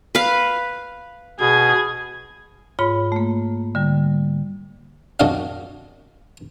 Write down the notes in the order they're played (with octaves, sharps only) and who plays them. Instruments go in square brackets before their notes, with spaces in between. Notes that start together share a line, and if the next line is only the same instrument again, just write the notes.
[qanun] B4 F5
[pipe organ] B2 [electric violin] G#4 G#6
[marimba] G#2 F4 C#5 B5
A3 A#3
D3 G3
[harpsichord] C2 F#2 D4 F#4 D#5 F5